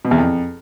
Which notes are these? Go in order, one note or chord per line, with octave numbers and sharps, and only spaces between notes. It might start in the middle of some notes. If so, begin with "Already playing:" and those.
B2
E2
F2